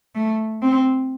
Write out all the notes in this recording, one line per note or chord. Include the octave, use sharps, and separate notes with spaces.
A3
C4